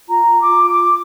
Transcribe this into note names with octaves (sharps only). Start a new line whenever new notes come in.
F4 A#5
D6
F4
D6